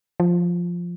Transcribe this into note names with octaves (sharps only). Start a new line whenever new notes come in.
F3